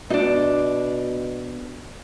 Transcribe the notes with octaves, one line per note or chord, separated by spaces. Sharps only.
B2 D4 D#4